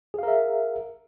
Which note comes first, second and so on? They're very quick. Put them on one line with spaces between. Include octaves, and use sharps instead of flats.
G#4 F5 A#4 E5